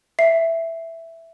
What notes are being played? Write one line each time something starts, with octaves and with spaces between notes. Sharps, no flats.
E5 C7